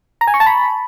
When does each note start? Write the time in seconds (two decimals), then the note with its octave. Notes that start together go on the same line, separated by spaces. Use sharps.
0.21 A#5
0.27 G#5
0.34 C#6
0.40 A5
0.47 B5